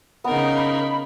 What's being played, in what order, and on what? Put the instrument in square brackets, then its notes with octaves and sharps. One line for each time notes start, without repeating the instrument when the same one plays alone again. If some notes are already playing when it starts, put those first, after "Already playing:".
[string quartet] C#3 D#4 A#4 [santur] B3
[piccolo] B5